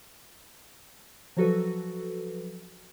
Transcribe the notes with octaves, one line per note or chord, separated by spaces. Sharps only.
F3 F#3 F#4 A4 B4